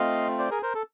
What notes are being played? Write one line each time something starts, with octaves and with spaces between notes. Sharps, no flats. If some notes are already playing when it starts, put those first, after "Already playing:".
Already playing: A3 C4 F4 D#5 F5
C5 D5
G#4 A#4
A#4 C5
A4